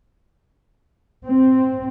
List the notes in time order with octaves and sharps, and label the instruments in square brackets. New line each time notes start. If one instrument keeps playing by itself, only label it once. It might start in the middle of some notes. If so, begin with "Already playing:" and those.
[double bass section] C4